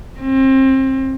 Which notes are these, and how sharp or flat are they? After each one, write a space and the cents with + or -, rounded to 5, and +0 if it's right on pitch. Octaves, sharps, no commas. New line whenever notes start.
C4 +30